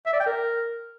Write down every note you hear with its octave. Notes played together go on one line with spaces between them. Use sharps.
E5
D5
G5
A#4